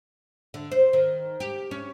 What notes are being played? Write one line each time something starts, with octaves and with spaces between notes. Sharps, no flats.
D3
C5
D#3
G4
C#4